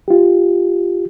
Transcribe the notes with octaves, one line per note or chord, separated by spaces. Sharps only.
F4 G4